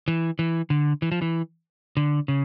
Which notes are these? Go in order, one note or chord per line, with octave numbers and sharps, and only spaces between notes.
E3
E3
D3
E3
F3
E3
D3
C#3